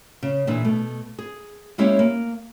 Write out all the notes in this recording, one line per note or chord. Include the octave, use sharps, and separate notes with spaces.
C#3
A#2 E3 D4 E4 G#4
B2 A3
G#4
G#3 A#3 C#4 E4 G4 C#5
A#3